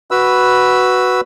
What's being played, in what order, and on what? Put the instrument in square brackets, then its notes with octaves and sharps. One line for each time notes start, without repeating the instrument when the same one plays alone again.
[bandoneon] F#4 B4 B5 E6